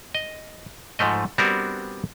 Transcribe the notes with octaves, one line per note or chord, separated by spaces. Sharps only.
D#5
G#2 F3 A3 D#5
G3 B3 C4 D4 F#4 A#4